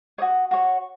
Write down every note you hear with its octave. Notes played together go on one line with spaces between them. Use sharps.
F#4 C#5 D#6
F#4 C#5